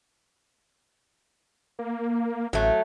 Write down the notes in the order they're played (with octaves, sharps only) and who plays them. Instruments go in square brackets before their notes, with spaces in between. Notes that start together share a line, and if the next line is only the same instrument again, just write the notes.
[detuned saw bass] A#3
[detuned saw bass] A1 [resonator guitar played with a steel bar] F#3 A3